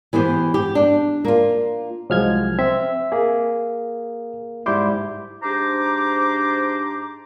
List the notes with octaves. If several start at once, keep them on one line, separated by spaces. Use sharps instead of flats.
E3 B3 G4 C5
G4
D4
A#3 F4
C2 F3 F#3 G#3 F6 G#6
C4 E5
A#3 G#4
G#2 G3 E4 C6 D6 G6
G#2 D4 G4 C5 A#5 D6